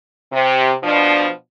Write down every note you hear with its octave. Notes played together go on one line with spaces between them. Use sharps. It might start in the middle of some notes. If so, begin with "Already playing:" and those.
C3
B2 F3 D4